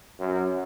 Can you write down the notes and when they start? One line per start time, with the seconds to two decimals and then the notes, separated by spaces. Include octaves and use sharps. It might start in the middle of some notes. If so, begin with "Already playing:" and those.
0.20 F#2